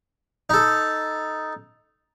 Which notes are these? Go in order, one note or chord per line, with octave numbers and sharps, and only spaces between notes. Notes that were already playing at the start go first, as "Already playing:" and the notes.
D#4 A4